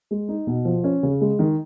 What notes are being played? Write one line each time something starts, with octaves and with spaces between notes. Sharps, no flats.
G#3
D#4
B2
F3
C#4
C#3
G#3
D#3